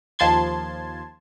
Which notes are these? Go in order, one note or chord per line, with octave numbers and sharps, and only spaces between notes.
D#2 F3 A5 C6 G#6